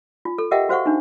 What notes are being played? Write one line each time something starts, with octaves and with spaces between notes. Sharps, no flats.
F4
A4
G4 A#4 D#5 E5 F#5 G5
F#4 C5 F5 F#5 C#6
D4 D#4